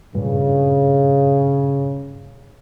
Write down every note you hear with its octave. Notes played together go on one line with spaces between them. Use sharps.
G2 A#2 C#3